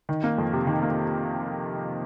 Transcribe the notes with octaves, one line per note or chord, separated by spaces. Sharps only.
D#3
A#3
F2
C3
D#3
A#3